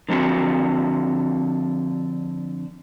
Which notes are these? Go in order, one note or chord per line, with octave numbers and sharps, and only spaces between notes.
D3 F3 C4 F#4